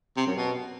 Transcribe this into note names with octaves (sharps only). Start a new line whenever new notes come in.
C3
F#2
B2